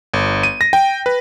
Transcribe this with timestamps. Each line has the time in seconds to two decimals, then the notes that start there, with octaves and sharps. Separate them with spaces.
0.14 G1
0.43 D#7
0.61 A#6
0.73 G5
1.06 B4